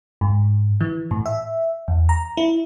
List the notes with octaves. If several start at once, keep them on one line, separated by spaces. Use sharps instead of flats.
G#2
E3
A2
E5
E2
A#5
E4